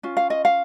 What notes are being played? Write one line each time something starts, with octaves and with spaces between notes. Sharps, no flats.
C#4 F4
F5
D#5
F5